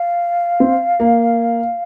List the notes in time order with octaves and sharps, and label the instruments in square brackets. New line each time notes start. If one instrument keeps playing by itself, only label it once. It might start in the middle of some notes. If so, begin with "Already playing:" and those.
Already playing: [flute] F5
[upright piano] C4
A#3